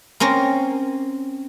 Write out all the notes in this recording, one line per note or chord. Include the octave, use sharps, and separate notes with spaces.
A#3 C4 C#4 A#4